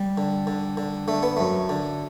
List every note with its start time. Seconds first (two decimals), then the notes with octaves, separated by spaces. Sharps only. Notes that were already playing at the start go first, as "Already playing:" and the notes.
Already playing: G3
0.18 D3
0.47 D3
0.77 D3
1.08 D3 A3
1.23 B3
1.37 F#2 A3
1.69 D3